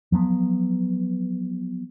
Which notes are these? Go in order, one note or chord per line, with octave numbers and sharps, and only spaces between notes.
F3 F#3 A#3 B3